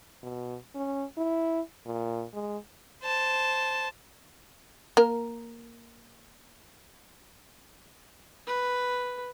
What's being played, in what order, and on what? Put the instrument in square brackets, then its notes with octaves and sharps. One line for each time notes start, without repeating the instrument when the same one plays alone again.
[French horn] B2
C#4
E4
A#2
G#3
[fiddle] C5 A5
[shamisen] A#3 A#4
[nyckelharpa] B4